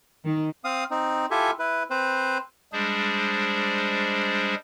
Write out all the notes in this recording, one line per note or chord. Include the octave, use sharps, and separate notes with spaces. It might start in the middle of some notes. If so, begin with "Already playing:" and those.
D#3
C4 F5 D#6
C4 D#4
E4 F4 G4 A4 E5 G#5
E4 B4
C4 B4 C5
G3 G#3 D4 G#4 C5